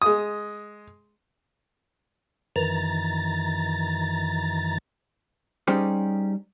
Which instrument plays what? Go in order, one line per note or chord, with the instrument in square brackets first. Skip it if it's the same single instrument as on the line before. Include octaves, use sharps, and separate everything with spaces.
[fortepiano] G#3 D#6
[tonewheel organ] F#2 D#3 E3 A#5 A6
[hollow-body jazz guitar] G3 C#4 D#4 G4 G#4 C5